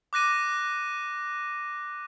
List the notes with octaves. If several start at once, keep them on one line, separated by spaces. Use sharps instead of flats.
D6 F#6 A#6 D#7